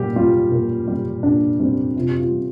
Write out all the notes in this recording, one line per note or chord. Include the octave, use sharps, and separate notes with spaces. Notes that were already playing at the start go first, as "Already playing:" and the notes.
Already playing: A#2 G3 G4
G3 F4
A#2
G3
A#2 D4
G3 C4
C3 F4
G4
F4
G3